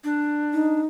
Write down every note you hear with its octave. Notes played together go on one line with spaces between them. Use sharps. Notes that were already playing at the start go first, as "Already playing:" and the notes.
D4
D#4